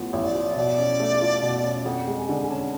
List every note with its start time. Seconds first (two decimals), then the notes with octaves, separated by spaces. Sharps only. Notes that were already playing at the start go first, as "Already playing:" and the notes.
Already playing: A1 A2 F3 B3
0.13 A1
0.24 D5
0.35 F3
0.56 B2 D5
0.78 C#4
1.00 A3
1.21 F4
1.42 B2
1.63 C#4
1.85 F2 F#5
2.07 G#3
2.17 G#5
2.29 D3
2.43 G#5
2.50 C#4 A5